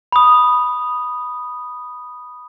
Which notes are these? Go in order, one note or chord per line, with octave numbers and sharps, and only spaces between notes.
B5 D#6